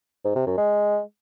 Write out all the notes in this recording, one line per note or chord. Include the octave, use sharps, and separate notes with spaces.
G#2
C3
F#2
G#3